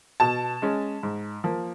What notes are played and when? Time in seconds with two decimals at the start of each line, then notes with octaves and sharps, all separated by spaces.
0.20 B2 A5
0.62 G#3 C#4
1.03 G#2
1.44 F3 A#3